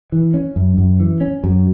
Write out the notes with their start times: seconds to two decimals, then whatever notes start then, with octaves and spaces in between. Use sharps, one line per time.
0.12 E3
0.34 C#4
0.56 F#2
0.78 F#2
1.00 E3
1.21 C#4
1.44 F#2